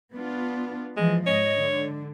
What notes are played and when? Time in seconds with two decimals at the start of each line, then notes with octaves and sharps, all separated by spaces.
0.14 B3 D4 F4
0.97 E3 F3 G#3
1.27 G#2 C#5 D#5
1.57 D3